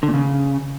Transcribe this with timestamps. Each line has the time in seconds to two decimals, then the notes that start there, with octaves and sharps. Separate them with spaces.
0.03 D3
0.08 A#2
0.14 C#3